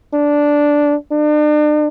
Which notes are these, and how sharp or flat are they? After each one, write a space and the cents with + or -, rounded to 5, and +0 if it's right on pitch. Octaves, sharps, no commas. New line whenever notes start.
D4 -5
D4 +40